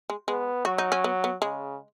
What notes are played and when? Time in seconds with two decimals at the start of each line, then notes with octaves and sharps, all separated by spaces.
0.10 G#3
0.28 G#3 B3
0.65 F#3 F#4
0.78 D#4
0.92 C#4
1.04 B3
1.24 B3
1.42 C#3 G#3